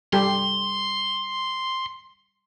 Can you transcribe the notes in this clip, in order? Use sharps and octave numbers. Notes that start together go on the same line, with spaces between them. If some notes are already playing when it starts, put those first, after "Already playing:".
G3 G4 A4 C6